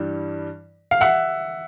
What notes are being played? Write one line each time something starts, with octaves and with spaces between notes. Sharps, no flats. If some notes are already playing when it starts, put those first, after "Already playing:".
Already playing: G2 E3 G3
F5
E5 F#5